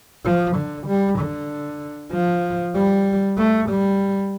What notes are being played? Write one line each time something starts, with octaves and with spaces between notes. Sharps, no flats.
F3
D3
G3
D3
F3
G3
A3
G3